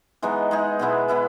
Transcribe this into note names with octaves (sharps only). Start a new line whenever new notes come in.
E3 G#3 B3 D#4
G#3 D#4 G#4
B2 G#3 B3 E4
B3 E4 B4